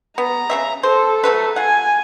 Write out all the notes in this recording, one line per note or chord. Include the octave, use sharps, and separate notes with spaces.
B3 A#5
C#3 C4 E5
A4 C5
F#3 A3 B4
F4 F#5 G#5